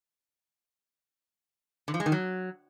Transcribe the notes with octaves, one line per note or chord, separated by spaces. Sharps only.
D3
F3
G#3
D#3
F#3